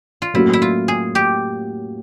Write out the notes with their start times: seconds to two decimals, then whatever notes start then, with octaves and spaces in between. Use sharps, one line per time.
0.22 F4
0.34 A2 F#3 A#3 C#4 E4 F#4
0.53 E4
0.62 F4
0.88 G#4
1.15 G4